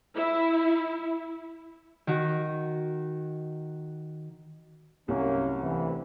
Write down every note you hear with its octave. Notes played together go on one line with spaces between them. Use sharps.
E4
D#3 F#4
C2 F#2 A#3 C#4
D2 C3 E3